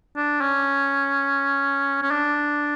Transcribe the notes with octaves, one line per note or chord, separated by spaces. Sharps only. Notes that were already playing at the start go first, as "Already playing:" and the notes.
D4
C#4
C#4
D4